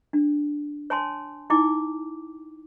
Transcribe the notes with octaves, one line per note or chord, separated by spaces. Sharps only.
D4
C#5 G#5 A5 C6
D#4 E4 G5 D6